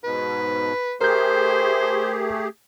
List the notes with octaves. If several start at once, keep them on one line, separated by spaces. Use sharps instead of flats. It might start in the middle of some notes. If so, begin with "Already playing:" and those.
G#2 B2 B4
A3 G4 G#4 A#4 C5 G6